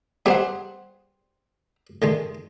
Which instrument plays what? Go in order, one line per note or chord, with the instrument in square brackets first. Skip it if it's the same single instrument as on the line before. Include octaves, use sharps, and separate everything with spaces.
[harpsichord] G3 B3 G#4 [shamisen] G4 C5 F#5
[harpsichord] D3 D#3 G#3